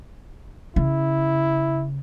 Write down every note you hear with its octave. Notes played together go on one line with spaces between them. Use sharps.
C#3 E4